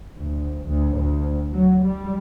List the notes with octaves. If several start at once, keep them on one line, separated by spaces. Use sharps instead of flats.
D2
D2
D2
F#3
G3